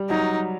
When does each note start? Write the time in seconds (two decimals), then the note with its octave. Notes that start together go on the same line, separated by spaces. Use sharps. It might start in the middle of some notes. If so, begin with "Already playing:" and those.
Already playing: G3
0.09 F#3 D#4